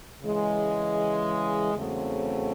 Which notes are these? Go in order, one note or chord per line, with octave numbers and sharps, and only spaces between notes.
C#3 E3 G#3
E2 C#3 F#3 A3 C4